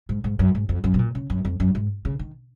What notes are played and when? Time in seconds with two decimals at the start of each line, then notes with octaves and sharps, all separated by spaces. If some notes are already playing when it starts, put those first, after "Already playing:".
0.09 G#2
0.24 G#2
0.39 F#2
0.55 G#2
0.69 F2
0.84 F#2
0.94 B2
0.99 A#2
1.15 C#3
1.30 F#2
1.45 F2
1.60 F#2
1.75 G#2
2.05 C#3
2.19 D#3